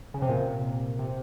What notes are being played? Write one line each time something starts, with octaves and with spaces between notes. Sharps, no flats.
C#3
C3
A#2
C3
C3